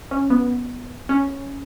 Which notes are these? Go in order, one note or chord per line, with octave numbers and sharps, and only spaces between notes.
C#4
B3
C#4